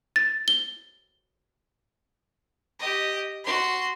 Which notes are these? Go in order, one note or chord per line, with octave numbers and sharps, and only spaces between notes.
A6
G7
G4 D#5
F#4 C6